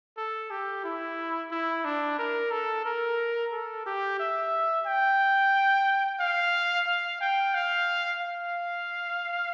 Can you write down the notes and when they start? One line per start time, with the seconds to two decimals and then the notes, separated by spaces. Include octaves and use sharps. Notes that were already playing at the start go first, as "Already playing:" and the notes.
0.17 A4
0.51 G4
0.84 E4
1.51 E4
1.85 D4
2.19 A#4
2.51 A4
2.85 A#4
3.52 A4
3.86 G4
4.19 E5
4.86 G5
6.20 F5
6.87 F5
7.21 G5
7.54 F5
8.21 F5